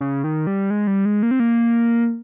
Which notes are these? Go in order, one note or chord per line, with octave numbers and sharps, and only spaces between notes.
C#3
D#3
G3
G#3
G3
G#3
A#3
C4
A#3